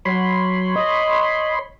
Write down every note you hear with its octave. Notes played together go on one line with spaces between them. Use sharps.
F#3 C#5 B5 C6
D#5